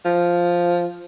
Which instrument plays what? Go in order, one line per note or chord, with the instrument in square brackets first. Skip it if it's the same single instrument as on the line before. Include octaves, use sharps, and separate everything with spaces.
[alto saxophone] F3